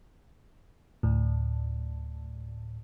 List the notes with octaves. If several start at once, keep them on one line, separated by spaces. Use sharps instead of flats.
D2 A2